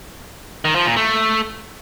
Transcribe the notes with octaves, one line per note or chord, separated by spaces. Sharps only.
D#3
F3
A#2
A3